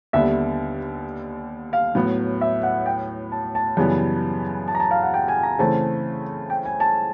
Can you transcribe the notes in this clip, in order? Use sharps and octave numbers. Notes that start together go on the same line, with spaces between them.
D#2 D3 G3 B3 E5
F5
A2 F#3 B3
E5
F#5
G5
A5
A5
F#2 C#3 E3 G3 B3
A5
A#5
A5
F5
F#5
G5
G#5
A#5
C#3 E3 A3 C4 A5
G5
G#5
A5